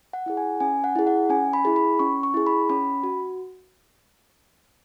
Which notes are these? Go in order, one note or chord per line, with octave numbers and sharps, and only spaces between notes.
F#5
E4 G#4 F#5
G#5
C#4 G#5
F#5
E4 G#4
F#5
C#4 G#5
B5
E4 G#4
B5
C#4 C#6
C#6
E4 G#4
B5
C#4 B5
F#4